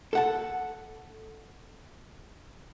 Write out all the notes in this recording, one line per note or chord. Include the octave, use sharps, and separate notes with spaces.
A4 F#5 A5